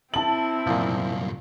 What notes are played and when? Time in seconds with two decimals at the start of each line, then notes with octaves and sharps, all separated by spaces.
0.14 C4 E4 A5 F#7
0.67 C2 F#2 A#2 F3